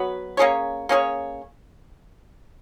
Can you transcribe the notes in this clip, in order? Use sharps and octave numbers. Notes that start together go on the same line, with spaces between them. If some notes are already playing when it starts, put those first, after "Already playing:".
Already playing: F#3 B3 F#4 B4
A#3 C#4 G#4 C#5
A#3 C#4 G#4 C#5